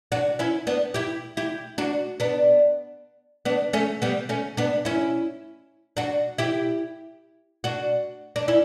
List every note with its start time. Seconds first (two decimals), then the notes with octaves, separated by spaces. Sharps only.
0.12 D4 F#4
0.39 C#4 E4
0.67 B3 D4
0.94 E4 G4
1.37 E4 G4
1.78 D4 F#4
2.20 B3 D4
3.45 B3 D4
3.73 A3 C#4
4.02 G3 B3
4.29 A3 C#4
4.57 B3 D4
4.85 C#4 E4
5.97 D4 F#4
6.38 E4 G4
7.64 D4 F#4
8.36 D4
8.48 C#4 E4